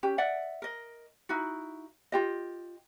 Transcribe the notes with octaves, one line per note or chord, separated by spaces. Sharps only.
C#4 G4
D5 E5 F#5
A#4 D#5
D#4 E4 F#4
F4 G4 D#5